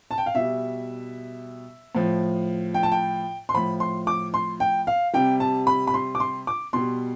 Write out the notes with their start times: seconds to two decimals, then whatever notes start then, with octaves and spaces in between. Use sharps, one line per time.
0.11 A5
0.18 G5
0.26 F5
0.35 B2 G3 E5
1.95 A2 F3
2.74 G5
2.83 A5
2.92 G5
3.49 C6
3.54 A2 F3 B5
3.80 C6
4.07 D6
4.34 C6
4.60 G5
4.87 F5
5.13 C3 G3 G5
5.40 A5
5.67 B5
5.87 B5
5.94 C6
6.15 D6
6.20 C6
6.47 D6
6.73 B2 G3 C6